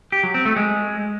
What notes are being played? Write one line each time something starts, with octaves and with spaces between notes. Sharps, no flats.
G4
F#3
C4
A3
G#3